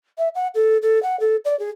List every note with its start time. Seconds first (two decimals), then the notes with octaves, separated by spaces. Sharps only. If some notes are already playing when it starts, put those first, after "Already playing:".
0.18 E5
0.35 F#5
0.55 A4
0.82 A4
1.03 F#5
1.20 A4
1.45 D5
1.59 G#4